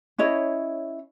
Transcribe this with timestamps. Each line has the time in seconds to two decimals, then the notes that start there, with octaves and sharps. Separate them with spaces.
0.18 C#4 E4 C#5 D#5